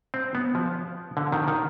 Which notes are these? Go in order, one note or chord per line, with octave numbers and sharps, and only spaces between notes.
C4
B3
F3
D3
D#3
D#3